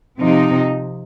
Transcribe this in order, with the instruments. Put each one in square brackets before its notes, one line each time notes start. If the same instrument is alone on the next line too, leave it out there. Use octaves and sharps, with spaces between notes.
[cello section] C3 F3 C4 D#4